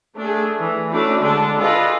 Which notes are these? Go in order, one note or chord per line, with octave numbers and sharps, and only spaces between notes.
A3 D4 G#4
E3
A3 C#4 D4 E4 F#4
D3 G#3 D4 A4 A5
F4 G#4 A4 B4 D5 D#5